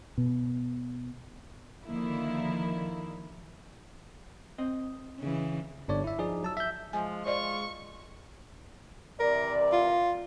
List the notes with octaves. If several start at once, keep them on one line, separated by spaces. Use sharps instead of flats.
B2
D3 D#3 F3 A#3 E4
C4 D#5
C#3 E3
G1 D4 C#5 D5
E4 E5
F3 D#4 G#4 D5
F#3 A5 E6
E5 G6
F3 G#3 G#5
F4 C5 D5 D#5 C#6
C3 E3 A#4 D5
F4